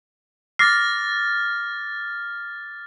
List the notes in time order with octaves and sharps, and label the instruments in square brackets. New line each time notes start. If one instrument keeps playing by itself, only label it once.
[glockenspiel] D6 A#6 C7 [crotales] F6 A6